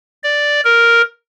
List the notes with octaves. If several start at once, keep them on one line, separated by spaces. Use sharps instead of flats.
D5
A#4